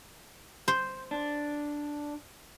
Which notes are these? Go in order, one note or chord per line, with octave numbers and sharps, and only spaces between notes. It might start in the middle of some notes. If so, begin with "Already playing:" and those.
C5
D4